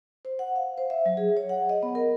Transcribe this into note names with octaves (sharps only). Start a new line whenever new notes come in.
C5
F#5
F5
C5
E5
F#3
G#4
C#5
F#5
D#5
B3
A#4